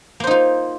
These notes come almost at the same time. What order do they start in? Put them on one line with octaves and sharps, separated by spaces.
A#3 C5 D#4 F4